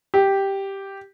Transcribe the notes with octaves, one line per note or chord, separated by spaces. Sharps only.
G4